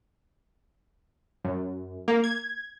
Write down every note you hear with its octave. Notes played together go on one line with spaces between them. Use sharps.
F#2
A#3
G#6